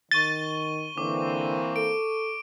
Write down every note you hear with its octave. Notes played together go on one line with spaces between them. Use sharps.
D#3 C#6 A6 D#7 G7
D3 E3 A#3 C4 D6
A4 D7